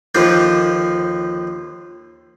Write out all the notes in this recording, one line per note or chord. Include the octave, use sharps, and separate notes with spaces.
D#2 D3 F3 F4 G4